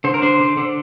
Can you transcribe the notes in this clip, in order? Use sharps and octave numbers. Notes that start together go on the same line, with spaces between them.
D3 C5
A#4
D4 C5
D3
D3